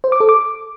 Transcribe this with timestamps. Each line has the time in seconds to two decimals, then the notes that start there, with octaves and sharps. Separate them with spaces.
0.04 C5
0.12 D6
0.20 A4
0.29 D6